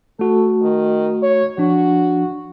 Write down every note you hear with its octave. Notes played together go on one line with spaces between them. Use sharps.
A3 F#4 A4
D#3
C#5
F3 D4 F#4